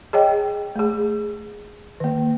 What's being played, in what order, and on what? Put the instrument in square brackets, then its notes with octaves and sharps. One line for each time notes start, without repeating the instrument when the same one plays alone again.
[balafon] G#4 C#5 D#5 G5
A3 G#4
D#3 A#3